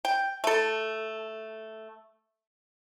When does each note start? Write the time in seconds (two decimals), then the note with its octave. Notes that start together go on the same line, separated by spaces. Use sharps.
0.05 G5
0.44 A3 A4